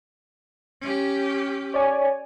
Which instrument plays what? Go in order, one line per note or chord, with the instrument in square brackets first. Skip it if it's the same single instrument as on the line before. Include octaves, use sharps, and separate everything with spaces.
[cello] C#4 G4
[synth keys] C#5 D5 G#5